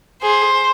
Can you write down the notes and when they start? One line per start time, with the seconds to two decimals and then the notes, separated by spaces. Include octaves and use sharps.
0.22 G#4 C5